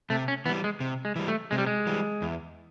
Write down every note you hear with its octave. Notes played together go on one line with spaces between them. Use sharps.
C3 A3
C#4
E3 G3 B3
G#3
C3
G#3
E3 G3
A3
C3 G#3
G3
G#3
E3 G3
E2